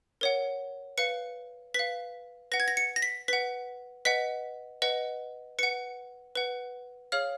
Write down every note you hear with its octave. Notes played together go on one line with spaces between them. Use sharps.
A#4 C#5 F#5
B4 F5 C#7
B4 F5 B6
B4 F#5 A#6
G#6
A#6
C#7
A#6
B6
B4 F#5 B6
B4 D#5 F#5 B6
B4 D#5 F#5
B4 F#5 C#7
B4 F#5
G#4 C#5 F5 F6